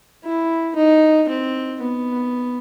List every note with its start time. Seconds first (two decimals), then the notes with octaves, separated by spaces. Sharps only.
0.24 E4
0.76 D#4
1.29 C4
1.81 B3